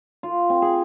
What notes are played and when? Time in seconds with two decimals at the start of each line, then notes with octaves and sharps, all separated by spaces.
0.23 F4
0.50 C4
0.62 G#4